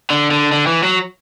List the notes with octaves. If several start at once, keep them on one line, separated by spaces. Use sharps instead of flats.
D3
D3
D3
E3
F#3